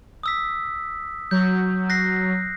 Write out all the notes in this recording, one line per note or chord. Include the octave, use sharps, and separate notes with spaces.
D#6 E6 B6
F#3 G6
F#6 A#6 C7